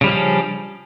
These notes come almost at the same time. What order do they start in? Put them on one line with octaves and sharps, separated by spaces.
C#3 G3 F3 C#4 D4